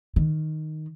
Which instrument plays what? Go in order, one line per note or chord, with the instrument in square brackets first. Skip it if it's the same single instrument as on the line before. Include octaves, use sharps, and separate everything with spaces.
[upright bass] D#3